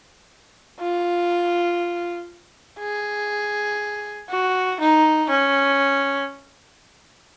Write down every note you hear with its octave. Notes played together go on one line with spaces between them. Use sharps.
F4
G#4
F#4
D#4
C#4